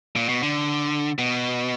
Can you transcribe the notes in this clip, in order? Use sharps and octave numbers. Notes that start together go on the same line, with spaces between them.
A#2
B2
D3
B2